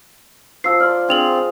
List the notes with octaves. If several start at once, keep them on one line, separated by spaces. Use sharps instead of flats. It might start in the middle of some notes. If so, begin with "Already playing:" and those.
F3 E6 C7
D5 C6 F6
C4 D4 F4 G#4 F7 F#7